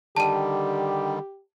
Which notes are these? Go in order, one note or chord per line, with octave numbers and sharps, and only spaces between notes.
D3 D#3 G3 G4 A5 D#7